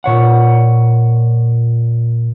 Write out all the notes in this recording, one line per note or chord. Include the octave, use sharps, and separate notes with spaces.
A#2 C#5 F#5